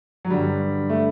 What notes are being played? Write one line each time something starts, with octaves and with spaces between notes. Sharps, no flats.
F#3
G2 D3 G3
A3